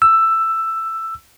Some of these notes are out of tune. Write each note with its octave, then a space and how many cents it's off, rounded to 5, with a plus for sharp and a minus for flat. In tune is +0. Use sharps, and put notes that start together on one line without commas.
E6 +10